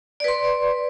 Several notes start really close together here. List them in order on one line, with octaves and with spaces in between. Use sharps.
D5 B4 C6